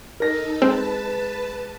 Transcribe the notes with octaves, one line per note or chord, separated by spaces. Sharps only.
D#4 A4 A#4 A#6
G#3 C4 B4 A5